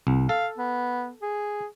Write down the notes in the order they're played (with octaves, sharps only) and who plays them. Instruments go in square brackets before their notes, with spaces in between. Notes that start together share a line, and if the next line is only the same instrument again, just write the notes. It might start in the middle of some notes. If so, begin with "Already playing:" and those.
[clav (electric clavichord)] C2
[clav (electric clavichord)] A4 [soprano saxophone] F5
[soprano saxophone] B3
G#4